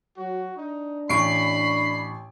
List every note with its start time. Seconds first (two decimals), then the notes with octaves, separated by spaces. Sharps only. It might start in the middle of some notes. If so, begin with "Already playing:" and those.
0.17 F#3 F#4
0.57 D4 D#4
1.09 A1 B5 C#6 C7 D7